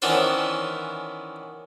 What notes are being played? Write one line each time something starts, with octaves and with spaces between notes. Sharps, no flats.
D#3 E3 B3 C#4 D4 C5